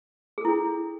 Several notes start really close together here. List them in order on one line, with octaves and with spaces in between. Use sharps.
G#4 A4 E4 D4